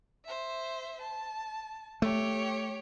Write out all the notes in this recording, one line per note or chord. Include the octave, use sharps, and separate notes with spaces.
C5 E5
A5
A3 G4 C#5